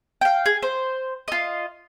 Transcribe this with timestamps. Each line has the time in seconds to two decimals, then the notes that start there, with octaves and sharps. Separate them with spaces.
0.21 F5 G5
0.46 G#4
0.62 C5
1.28 F4 D#5